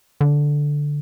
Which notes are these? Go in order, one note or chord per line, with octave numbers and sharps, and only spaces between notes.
D3